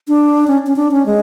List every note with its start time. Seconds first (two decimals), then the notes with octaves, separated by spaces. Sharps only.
0.08 D4
0.47 C#4
0.67 C#4
0.76 D4
0.92 C#4
1.06 G#3